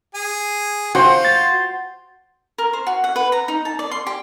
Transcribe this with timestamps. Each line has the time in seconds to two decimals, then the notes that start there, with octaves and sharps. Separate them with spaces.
0.15 G#4 G#5
0.95 F4 F#4 C5 G5
1.25 A6
2.58 A#4
2.73 C5
2.87 F#4
3.04 F#5
3.16 B4
3.32 A#5
3.48 D#4
3.65 A5
3.79 D5
3.91 C6
4.06 G4